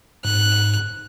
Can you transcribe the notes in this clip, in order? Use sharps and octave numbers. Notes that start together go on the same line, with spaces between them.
G#2 F#6